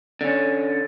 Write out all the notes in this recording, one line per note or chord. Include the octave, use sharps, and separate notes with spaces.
D3 C#4